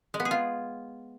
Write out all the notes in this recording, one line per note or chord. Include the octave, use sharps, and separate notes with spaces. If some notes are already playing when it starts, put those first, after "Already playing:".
G#3
B3
G#4
F4